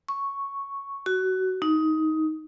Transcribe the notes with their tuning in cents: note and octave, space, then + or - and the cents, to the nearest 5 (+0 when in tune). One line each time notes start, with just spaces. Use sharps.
C#6 +0
F#4 +20
D#4 +15